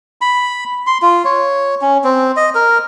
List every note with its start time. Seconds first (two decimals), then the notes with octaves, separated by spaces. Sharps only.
0.21 B5
0.87 C6
1.02 F4
1.25 C#5
1.81 C#4
2.04 C4
2.36 D#5
2.55 A#4